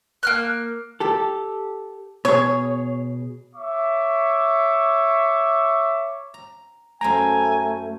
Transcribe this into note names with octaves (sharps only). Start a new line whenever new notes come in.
A#3 F6 F#6
G4 A4
B2 G#4 C#5
C#5 E5 C#6 D6
A#5
F#2 A3 C5 G5 G#5 A#5